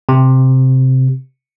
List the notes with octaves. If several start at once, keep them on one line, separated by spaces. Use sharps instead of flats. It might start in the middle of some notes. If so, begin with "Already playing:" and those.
C3